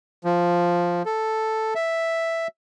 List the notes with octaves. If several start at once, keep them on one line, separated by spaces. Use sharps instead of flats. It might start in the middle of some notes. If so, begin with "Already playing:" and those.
F3
A4
E5